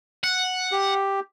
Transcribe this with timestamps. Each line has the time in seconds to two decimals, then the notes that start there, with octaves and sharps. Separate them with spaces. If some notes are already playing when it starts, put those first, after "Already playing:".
0.24 F#5
0.72 G4